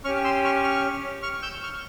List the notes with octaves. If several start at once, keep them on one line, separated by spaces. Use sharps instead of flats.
C#4 G4 C#6 F6
C6 E6
C#6 F6
C#6 F6
C#6 F6
E6 G6
C#6 F6